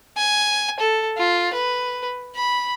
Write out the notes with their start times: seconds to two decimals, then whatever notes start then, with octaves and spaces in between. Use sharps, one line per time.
0.17 G#5
0.80 A4
1.17 F4
1.53 B4
2.35 B5